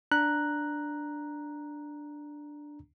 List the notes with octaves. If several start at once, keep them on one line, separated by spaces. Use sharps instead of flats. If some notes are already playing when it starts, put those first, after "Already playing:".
D4 A#5 F#6